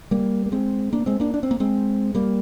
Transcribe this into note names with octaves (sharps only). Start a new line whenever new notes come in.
G3 A#3
A#3
G#3 C4
A#3 D4
G#3 C4
A#3 D4
D4
C4
A#3
G#3 C4
G3 A#3